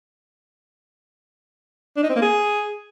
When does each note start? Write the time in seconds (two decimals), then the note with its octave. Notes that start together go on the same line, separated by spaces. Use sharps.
1.96 D4
2.03 D#4
2.09 C4
2.15 A#3
2.22 G#4